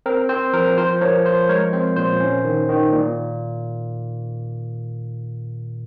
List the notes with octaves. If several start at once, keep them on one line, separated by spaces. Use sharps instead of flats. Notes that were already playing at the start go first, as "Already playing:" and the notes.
C4 A#4
C4 C5
F3 A#4
F3 C5
F3 A#4 C#5
F3 C5
G#3 A#4 C#5
C4 C5
A#2 C5
C#4
D#3
D#3
A#2